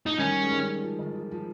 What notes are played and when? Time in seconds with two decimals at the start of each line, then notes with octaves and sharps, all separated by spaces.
0.06 D#4
0.19 D#3 G3 C#4
0.43 G#3
0.51 D#3 G3
0.83 F3
0.99 D#3
1.15 F3
1.31 F3